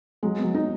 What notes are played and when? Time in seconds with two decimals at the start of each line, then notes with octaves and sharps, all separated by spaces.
0.23 F#3 G#3
0.39 B3
0.44 F#3
0.55 D#4